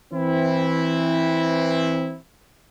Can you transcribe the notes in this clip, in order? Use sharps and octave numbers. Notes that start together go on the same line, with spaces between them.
E3 C4 E4